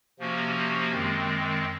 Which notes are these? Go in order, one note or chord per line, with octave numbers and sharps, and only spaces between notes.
C3 F3 A#3 C#4 F#4
F#2 D#3 G#3 C4